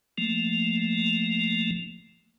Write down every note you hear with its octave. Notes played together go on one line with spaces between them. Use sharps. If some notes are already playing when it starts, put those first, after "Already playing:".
F3 A3 A#3